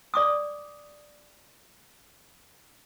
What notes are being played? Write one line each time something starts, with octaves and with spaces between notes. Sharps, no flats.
D5 D6 D#6